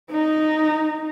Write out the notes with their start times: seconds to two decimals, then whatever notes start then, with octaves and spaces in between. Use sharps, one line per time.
0.11 D#4